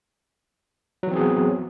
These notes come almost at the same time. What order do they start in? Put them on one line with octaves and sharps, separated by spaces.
F#3 E3 C4 G#4 B3